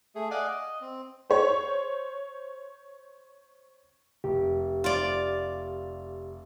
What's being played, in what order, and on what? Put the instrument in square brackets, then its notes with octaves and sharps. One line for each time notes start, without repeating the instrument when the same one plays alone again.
[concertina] A3 G#4
D5 D#5 F5 F#5 G#5 D6
D#5
C4
[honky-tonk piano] C5 C#5
[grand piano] F1 [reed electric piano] G4
[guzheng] F4 D5